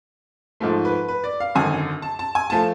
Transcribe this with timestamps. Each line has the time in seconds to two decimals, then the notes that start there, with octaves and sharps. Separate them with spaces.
0.60 G#2 F3 A3
0.85 B4
1.08 B4
1.24 D5
1.40 F5
1.55 G#1 F#2 D3 G#5
2.02 A5
2.19 A5
2.35 G#5
2.50 F3 A3 F4 A5